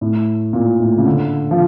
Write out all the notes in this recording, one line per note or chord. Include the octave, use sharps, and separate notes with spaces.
A2
A#2
A2
C#3
D3
F3